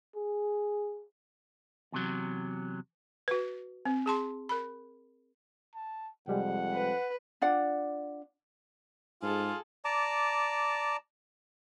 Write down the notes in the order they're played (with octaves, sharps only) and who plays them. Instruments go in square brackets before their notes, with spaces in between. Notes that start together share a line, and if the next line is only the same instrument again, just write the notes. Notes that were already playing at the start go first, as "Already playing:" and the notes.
[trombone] G#4
[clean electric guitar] E2 C3 F#3
[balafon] F#4 B4
C4
G#4 A5 C6
A#4 B5
[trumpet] A5
[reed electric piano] C2 G3 G#3 [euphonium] F2 [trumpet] F#5
[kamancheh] B4
[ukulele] D4 F4 D5 F#5
[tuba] G#2 [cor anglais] F4 [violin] G#4 A4
[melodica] D5 A5 A#5 D6